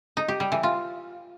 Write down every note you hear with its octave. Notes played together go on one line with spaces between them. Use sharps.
D#4
G4
G3
E3
F4